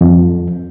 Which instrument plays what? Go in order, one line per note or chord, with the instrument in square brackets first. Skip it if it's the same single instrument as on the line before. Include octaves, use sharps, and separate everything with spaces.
[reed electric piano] F2